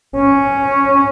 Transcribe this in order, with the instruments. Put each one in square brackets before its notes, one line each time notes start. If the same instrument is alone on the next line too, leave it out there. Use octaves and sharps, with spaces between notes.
[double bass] C#4